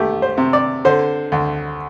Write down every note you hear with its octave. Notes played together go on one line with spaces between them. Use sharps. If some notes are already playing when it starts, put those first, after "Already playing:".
Already playing: C2 A3 G4
C5
C3
D5
D3 C5
D2